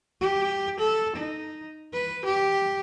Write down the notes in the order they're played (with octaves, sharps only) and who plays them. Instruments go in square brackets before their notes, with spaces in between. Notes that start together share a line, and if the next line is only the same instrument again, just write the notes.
[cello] G4
A4
D#4
B4
G4